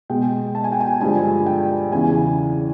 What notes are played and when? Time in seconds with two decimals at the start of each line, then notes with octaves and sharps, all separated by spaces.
0.10 B2 G#3 G5
0.55 A5
0.64 G#5
0.72 G5
0.80 G#5
1.01 G2 D3 F3 G#3 G#5
1.46 G5
1.92 E2 C#3 E3 G#5